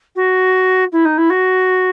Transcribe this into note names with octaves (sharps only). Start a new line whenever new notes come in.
F#4
E4
D#4
E4
F#4